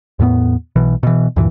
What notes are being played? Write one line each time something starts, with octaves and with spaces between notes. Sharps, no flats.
E2 A2 A3 B3
B1 B2 E3
B2 E3
D2 G2 A#2 E3